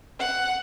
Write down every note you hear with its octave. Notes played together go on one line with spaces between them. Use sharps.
F#5